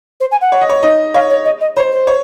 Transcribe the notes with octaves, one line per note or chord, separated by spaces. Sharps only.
C5
G#5
F#5
C#5
D#5
C#5
D#4 D#5
C#5 F5
C#5
D#5
D#5
C5 C#5
C5
C#5